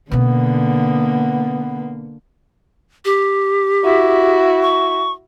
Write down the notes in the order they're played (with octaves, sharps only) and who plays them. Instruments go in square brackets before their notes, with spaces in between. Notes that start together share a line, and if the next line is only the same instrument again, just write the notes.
[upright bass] B2 C#4 [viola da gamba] D3 A#3 [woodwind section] B3
[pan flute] G4
[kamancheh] E4 F#4
[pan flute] C#6